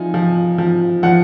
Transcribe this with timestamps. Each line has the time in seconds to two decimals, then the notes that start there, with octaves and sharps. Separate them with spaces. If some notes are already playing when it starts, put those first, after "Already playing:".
Already playing: F3 D#4 G#5
0.14 F3
0.58 F3
1.03 F3 F#5